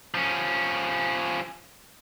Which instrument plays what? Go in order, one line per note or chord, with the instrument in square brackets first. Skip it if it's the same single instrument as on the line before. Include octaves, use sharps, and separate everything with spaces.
[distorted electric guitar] F3 C#4